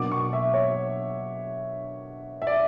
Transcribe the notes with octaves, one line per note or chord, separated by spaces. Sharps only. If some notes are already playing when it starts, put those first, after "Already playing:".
Already playing: B2 F#3 A#3 D4 D6
C#6
E5
C#5
E5
D5